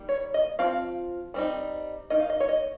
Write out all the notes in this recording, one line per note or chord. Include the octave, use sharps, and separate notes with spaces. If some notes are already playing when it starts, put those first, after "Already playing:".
Already playing: D#3 G3 A#3
C#5
D#5
F3 C4 F4 F5
G3 C4 D#4
D#3 A#3 D#4 D#5
F5
D#5
C#5
D#5